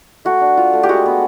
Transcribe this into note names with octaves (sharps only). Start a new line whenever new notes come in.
A3 F#4
D4
F4
A3
G4
G#3 F#4
B3